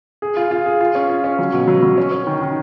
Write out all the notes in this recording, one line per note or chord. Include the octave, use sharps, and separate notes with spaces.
G#4
F4
F4
G#4
F4
C#4
F4
C#4
F#3
B2
F#3
F#3
C#4
C#4
D#3
D#3